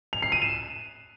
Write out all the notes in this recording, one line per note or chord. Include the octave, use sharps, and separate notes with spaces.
F7
C7
D#7
E7